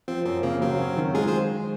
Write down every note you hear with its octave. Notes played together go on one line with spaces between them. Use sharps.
F3 C4
F#2 C4
C#3 A#3
F#3 C4
C#4
D#3
G#3 F4 G#4
G#4 C5